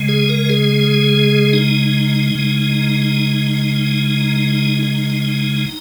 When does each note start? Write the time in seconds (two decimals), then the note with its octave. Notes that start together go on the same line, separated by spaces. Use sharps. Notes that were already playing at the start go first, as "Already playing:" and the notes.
Already playing: C#3 G#3
0.08 G#4
0.29 A#4
0.49 G#4
1.53 D#4
2.35 C#3 G#3
4.83 D#4